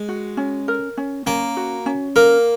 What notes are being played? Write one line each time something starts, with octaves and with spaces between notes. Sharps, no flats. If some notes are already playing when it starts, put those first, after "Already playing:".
Already playing: G#3
F#4
C#4
A#4
C#4
A#3 C#4
F#4
C#4
A#3 A#4